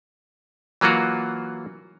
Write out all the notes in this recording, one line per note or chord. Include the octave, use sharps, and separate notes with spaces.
E3 F#3 A#3 F4 F#4